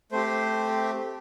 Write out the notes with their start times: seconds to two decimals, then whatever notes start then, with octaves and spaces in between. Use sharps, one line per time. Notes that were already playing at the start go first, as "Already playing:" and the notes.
0.12 A3 C4 G4 C5